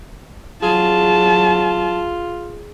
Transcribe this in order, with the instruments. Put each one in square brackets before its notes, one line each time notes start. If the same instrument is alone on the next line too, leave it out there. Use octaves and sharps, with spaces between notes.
[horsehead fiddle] F#3 A5 [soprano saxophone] F4 [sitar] G#4